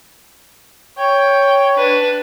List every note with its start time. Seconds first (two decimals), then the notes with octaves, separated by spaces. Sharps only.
0.98 C#5 G5
1.75 D4 B4